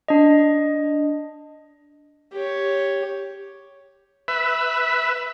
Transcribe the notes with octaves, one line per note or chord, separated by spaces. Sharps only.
D4 D#5
G4 C#5
B4 E5